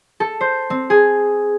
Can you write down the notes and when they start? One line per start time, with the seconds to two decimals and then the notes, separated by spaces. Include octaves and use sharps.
0.20 A4
0.41 C5
0.70 C4
0.90 G#4